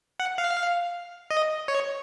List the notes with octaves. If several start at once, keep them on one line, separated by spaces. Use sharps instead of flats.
F#5
F5
D#5
C#5